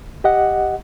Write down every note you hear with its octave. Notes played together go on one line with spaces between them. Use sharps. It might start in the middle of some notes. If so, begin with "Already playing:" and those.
G4 D#5 F#5